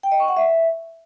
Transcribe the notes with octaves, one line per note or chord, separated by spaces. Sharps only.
G5
D#5
C#6
F#5
E5